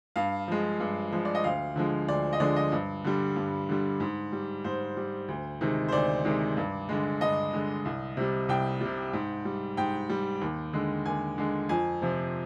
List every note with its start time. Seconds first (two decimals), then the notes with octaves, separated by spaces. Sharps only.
0.16 G2 F5
0.48 F3 G#3
0.80 G2
1.12 F3 G#3
1.25 D5
1.35 D#5
1.44 D2 F5
1.76 D3 F3 G#3
2.08 D2 D5
2.33 D#5
2.40 D3 F3 G#3 D5
2.56 D#5
2.72 G2
3.04 D3 G3
3.36 G2
3.69 D3 G3
4.00 G#2
4.32 G3
4.64 G#2 C5
4.97 G3
5.28 D2
5.61 C3 D#3 G#3
5.88 C5
5.92 D2 D5
6.25 C3 D#3 G#3
6.57 G2
6.89 D3 G#3
7.21 G2 D#5
7.53 D3 G#3
7.85 C2
8.17 C3 G3
8.49 C2 G5
8.81 C3 G3
9.13 G#2
9.45 G3
9.77 G#2 G5
10.09 G3
10.41 D#2
10.73 D3 G#3
11.05 D#2 G#5
11.38 D3 G#3
11.69 F2 G#5
12.02 C3 F3